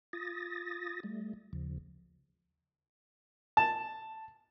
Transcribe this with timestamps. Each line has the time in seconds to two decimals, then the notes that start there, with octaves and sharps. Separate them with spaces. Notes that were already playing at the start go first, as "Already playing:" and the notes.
0.13 F4 D#6 A6 A#6
1.03 G3 A3
1.53 D#2 C#3 F3
3.57 A5